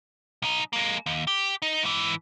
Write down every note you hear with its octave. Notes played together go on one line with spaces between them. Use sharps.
B1 D#4
G#3 A#3
D#2
G4
D#4
G#2 E3